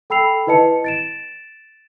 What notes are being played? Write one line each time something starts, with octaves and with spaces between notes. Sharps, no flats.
A4 G5 B5 E6 C7 F7
E4 B4 D#5 A5 C#7
A6 D7 E7